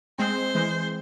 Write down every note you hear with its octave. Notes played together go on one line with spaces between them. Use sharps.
G#3 C4 C5
E3 G#3